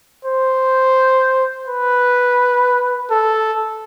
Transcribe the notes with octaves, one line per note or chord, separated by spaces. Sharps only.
C5
B4
A4